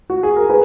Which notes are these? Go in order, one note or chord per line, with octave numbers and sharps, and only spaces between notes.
F#4
G#4
A#4
G#4 B4